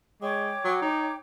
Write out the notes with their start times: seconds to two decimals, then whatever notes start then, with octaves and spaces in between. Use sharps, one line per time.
0.22 G#3 C#5 G5 D6
0.65 F#3
0.82 D#4